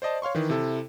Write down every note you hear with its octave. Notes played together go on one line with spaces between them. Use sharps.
C5 D5 D#5 A5
C#5 F5 C6 C#6
D#3 E3
C3 E4 A4